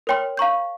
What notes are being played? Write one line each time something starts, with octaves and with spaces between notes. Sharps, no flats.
A#4 C#5 G5 C6 F6
F5 A#5 C#6 G6